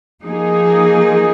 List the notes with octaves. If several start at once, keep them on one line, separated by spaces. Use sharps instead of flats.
F3 A#3 D#4 G#4